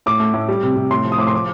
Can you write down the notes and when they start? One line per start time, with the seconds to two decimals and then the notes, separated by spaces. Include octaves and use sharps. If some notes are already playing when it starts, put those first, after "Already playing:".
0.06 A2 D6
0.20 A3
0.34 A2
0.49 G3
0.63 C3
0.76 C3
0.91 A2 C6
1.05 F3
1.12 D#6
1.18 A2 D6
1.27 C6
1.33 F3 D6